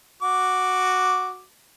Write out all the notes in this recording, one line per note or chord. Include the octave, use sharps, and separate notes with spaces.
F#4 D6